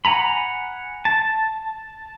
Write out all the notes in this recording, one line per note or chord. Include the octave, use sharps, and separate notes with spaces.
F#5 G#5 A#5 B5
A5